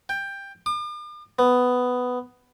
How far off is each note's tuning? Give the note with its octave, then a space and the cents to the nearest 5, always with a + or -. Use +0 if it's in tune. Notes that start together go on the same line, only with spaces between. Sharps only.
G5 +15
D6 +45
B3 +10